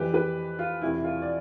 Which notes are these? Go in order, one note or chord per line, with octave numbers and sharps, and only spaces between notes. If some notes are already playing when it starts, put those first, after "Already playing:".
Already playing: F2 E3 G3 G4 B4
G4 B4
F4
E1 E2 C3 G3 E4
F4
D5